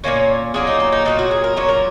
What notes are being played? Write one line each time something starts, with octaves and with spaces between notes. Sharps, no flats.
A#2 F#3 A#3 C#4 C#5
A#2 F#3 A#3 C#4 G#4
D#4
D#4
D#4
A#2 F#3 C#4 D#4
F#4
G#4
A#4
A#2 F#3 C#4 C#5
A#4